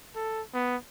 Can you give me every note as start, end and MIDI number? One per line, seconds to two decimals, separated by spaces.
0.15 0.41 69
0.54 0.76 59